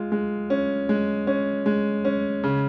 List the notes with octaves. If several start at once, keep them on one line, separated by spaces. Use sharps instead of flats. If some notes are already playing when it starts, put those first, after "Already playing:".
Already playing: G#3 F4
G#3
C#4
G#3
C#4
G#3
C#4
C#3